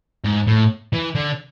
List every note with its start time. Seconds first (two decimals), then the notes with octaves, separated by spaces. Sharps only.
0.25 G#2
0.47 A2
0.93 E3
1.15 D3